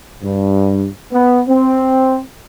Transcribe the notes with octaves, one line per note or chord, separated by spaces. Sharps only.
G2
B3
C4